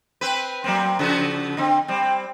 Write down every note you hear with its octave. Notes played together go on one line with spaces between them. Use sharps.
C4 B4
F#3 A#3 C4
C#3 F3 F#4
D3 C4
G3 C4